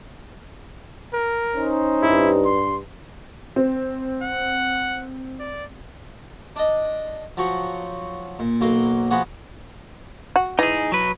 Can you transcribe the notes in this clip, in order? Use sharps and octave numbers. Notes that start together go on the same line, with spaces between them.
A#4
C#4 D#4 C5
G2 E4
C6
C4
F#5
D5
D4 D#5
F3 F#3 C#6
A#2
B1 F#3 A#3 C6
F3 B3 F#4 G#4
F#4
E3 D#4 G#4
F#3 B4